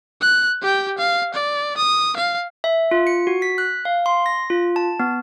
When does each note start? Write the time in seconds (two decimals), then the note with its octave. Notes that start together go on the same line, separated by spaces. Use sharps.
0.21 F#6
0.61 G4 G5
0.98 F5
1.34 D5
1.77 D#6
2.16 F5
2.64 E5
2.91 F4
3.07 C#7
3.27 F#4
3.42 B6
3.58 F#6
3.85 F5
4.06 C6
4.26 A#6
4.50 F4
4.76 A5
4.99 B3